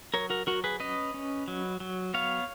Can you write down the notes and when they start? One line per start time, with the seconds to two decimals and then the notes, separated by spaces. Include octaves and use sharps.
0.14 F#3 A#4 C#5
0.30 F#4 A#4
0.47 F#3 F#4 A#4
0.64 G#4 B4
0.80 C#4 B4 D#5
1.14 C#4
1.48 F#3
1.80 F#3
2.14 B3 C#5 F5